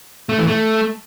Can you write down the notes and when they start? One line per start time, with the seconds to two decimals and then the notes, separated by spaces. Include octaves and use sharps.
0.29 A3
0.38 E3
0.47 A3